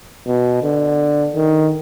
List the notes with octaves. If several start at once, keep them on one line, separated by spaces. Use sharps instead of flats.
B2
D3
D#3